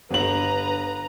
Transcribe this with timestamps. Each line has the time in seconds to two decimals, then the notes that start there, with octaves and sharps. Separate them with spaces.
0.11 G1 D3 B4 A#5 F#7